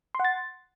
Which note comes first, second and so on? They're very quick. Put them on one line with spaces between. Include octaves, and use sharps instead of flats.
C6 F#5 A6